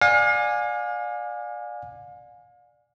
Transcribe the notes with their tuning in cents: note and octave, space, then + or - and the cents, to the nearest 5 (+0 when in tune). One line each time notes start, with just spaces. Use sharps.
D5 +15 F5 +40 G#5 -10